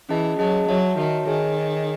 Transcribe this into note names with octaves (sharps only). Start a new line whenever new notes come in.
E3 C#4 G#4 D#5 A5
F#3 C#4 G#4 D#5 A5
F#3 F#4 C#5 E5 A5
D#3 F#4 C#5 E5 A5
D#3 G#4 C#5 G#5
G#4 C#5 G#5